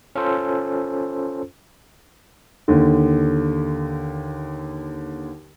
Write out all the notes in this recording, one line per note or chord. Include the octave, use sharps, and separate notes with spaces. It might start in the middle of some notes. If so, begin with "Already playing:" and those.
C#4 F4 A4 C5
D#2 D3